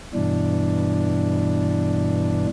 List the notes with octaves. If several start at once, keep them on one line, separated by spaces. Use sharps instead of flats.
G2 B2 E3 D4